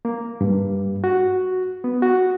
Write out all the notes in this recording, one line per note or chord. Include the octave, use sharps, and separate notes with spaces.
A#3
G2
F#4
B3
F#4